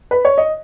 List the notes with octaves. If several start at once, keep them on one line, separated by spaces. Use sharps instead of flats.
B4
C#5
D#5